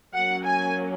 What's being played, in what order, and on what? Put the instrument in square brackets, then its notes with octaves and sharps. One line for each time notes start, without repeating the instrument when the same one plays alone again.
[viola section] F#3 A#3 C#4 F#5
G#5